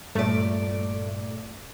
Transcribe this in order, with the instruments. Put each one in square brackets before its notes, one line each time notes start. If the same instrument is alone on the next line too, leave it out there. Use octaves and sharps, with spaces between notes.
[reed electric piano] G2 [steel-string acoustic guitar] A#2 D5 [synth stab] A3